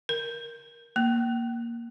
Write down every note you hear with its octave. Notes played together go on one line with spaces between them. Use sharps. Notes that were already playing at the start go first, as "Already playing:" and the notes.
A#4
A#3